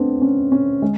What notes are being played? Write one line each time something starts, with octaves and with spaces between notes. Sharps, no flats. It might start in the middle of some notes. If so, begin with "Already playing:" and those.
Already playing: A3 B3 C4 D4
C#4
C#4
G#3